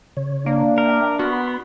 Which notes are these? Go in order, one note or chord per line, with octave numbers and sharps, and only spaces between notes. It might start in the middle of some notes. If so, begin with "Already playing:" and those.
C#3 C#5
A#3 D4
A#4 E5 G5
B3 F#4 B5 C6